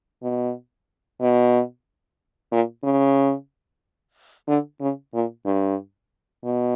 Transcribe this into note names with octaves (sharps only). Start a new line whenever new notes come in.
B2
B2
A#2
C#3
D3
C#3
A#2
G2
B2